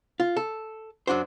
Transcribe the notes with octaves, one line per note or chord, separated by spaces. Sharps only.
F4
A4
F#2 D4 F#4 C5